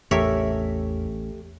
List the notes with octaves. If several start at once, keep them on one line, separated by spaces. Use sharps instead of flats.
A1 E2 A3 G4 A4 A#4 C#5 E5